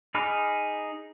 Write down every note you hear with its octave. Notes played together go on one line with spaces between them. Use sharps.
D#4 G#4 B5 D6 F6